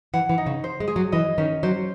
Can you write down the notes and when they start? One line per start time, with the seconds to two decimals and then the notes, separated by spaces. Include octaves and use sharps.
0.14 E3 F#5
0.29 E3
0.38 D#4
0.46 C#3
0.64 C5
0.80 G#3
0.88 G#4
0.96 F#3
1.12 E3 D#5
1.38 D#3 C#4
1.63 F#3 C5